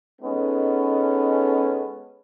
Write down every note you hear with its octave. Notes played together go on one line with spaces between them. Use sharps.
G#3 B3 C#4 D#4 A4